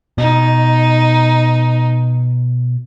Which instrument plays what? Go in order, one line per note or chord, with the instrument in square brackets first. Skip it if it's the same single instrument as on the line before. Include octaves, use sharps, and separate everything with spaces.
[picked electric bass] B2 [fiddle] D#4